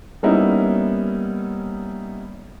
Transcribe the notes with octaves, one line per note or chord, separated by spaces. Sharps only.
G3 A#3 B3 C#4 D#4 E4